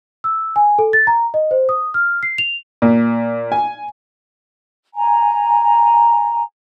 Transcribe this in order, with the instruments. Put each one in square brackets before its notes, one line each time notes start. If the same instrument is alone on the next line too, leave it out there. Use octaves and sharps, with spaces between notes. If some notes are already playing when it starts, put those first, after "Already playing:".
[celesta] E6
G#5
A4
A6
A#5
D#5
C5
D#6
F6
C7
F7
[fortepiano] A#2
G#5
[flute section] G#5 A#5